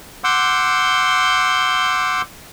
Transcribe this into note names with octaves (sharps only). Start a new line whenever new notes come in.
F#5 C6 D6 E6 G6